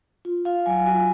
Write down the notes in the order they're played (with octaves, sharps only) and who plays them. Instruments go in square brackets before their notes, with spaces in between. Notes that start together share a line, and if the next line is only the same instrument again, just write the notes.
[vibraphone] F4
F4 F5
F#3 G#5
F#4 G#5